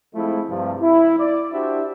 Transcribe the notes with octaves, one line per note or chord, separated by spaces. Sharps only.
F3 G#3 A3 C4 E4
G2 C3 F3
E4
D5
D4 E4 F#4 G4 C5 E5